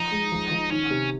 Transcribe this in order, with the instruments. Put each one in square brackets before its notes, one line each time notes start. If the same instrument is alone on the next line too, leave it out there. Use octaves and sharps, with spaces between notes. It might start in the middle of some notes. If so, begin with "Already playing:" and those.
Already playing: [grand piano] F3 [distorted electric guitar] D#4
[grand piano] G#3
F3
F3
[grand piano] D#3 [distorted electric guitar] C#4
[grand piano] C3